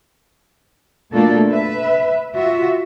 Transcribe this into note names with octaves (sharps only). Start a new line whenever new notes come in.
B2 A3 A#3 D4 F4 A4
B4 E5
F4 F#4 E5